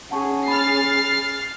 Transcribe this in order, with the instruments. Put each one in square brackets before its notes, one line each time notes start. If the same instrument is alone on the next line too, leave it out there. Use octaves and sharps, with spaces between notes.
[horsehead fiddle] C#4 G#4 [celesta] F#5 A5 C#6
[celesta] B5 [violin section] F6 A6 C7